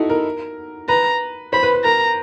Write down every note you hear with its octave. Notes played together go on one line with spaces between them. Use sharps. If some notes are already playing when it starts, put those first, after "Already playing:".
Already playing: D#4 E4 F#4 A4
A#4
B4 A#5
C5 B5
B4
B4
A#4 A#5